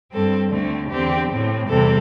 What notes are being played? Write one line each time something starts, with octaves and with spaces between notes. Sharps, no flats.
G2 G3 C4 A4
D2 D3 A3 C4
E2 D3 C4 G4
A2 A3 C4
E2 C3 G3 C4 A4